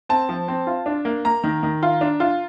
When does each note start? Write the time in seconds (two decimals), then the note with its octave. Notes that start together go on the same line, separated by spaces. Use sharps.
0.09 C4 A5
0.29 F3
0.48 C4
0.67 F4
0.86 D4
1.05 A#3
1.25 A#3 A#5
1.44 D#3
1.63 D#3
1.83 F4
2.01 D4
2.20 F4